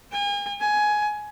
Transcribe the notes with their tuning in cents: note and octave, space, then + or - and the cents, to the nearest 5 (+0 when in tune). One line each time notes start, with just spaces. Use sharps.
G#5 -40
G#5 +15